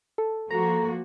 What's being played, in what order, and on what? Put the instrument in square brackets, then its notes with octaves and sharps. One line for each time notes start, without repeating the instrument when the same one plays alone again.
[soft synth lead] A4
[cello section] F3 A#3 F#4 [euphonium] A4 [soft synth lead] A#5